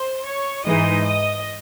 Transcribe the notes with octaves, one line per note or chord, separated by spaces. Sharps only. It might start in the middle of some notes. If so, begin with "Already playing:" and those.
Already playing: C5 C6
C#5 C#6
G#2 E3 G#3 D#4 D#5 D#6
D#5 D#6